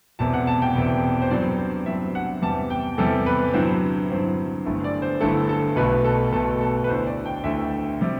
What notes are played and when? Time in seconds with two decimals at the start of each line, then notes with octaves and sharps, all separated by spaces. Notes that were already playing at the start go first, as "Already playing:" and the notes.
0.19 E1 E2 C3 A5
0.34 F#5
0.47 A5
0.62 G5
0.75 E1 E2 C3
1.22 C5
1.31 G2 F#3 C4 D5
1.59 C5
1.86 G2 F#3 C4 E5
2.15 F#5
2.42 E2 C3 G3 A5
2.70 G5
2.98 E2 C3 G3 A4
3.26 B4
3.53 G2 D3 F#3 C4 E4 C5
4.09 G2 D3 F#3 C4 E4
4.66 G1 G2 D3 A3 E4
4.84 D5
5.02 C5
5.21 G1 G2 D3 A3 E4 A4
5.49 A4
5.76 B1 B2 A3 B4
6.04 A4
6.33 B1 B2 A3 A4
6.61 A4
6.84 B4
6.88 D2 D3 A3 E4 C5
7.06 D5
7.25 G5
7.44 D2 D3 A3 E4 E5
8.01 C3 G3